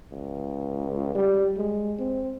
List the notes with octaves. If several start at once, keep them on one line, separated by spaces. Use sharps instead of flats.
C#2
G3
G#3
C4